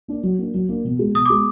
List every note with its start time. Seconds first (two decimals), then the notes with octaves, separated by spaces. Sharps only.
0.08 A#3 D4
0.23 F#3
0.39 A#3 D4
0.54 F#3
0.69 A#3 D4
0.85 B2
0.99 G#3 B3
1.15 B2 D#6
1.25 D6
1.30 G#3 B3